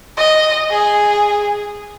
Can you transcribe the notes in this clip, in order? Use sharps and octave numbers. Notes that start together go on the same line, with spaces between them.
D#5
G#4